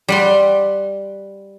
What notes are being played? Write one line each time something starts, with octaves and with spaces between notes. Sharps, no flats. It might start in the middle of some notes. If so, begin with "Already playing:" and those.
G3 F#5 C6